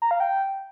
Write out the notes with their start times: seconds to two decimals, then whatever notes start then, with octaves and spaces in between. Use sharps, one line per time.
0.02 A#5
0.11 F5
0.20 G5